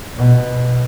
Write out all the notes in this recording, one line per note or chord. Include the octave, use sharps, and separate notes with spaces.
B2